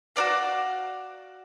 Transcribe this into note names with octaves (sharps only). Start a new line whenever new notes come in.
F#4 A#4 D5 F5